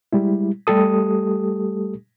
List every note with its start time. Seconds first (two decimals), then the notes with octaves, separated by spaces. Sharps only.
0.13 G3 G#3 E4
0.67 G3 A3 G4 A4 D#6